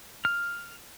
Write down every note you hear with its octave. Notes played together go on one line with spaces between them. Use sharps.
F6